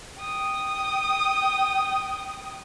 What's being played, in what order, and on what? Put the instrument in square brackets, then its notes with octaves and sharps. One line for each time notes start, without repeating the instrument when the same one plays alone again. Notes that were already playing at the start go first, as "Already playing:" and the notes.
[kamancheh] G5 D#6